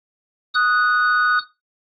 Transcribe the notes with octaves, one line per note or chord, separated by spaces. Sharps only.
D#6 F#6